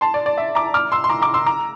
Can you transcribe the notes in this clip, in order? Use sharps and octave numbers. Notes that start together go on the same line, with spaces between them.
A5 C6
D5
D5
E5
A#5 D6
D6 F6
C6 E6
C6
A#5 D6
A#5 D6
C6 E6
A#5 D6